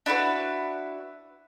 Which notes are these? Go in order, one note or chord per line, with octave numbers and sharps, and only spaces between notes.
D4 E4 F#4 B4